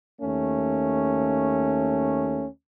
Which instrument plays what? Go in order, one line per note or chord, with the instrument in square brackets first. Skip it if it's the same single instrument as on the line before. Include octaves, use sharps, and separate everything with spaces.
[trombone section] D#2 A3 C#4